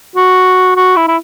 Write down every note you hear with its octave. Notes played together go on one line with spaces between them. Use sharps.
F#4
F#4
E4
E4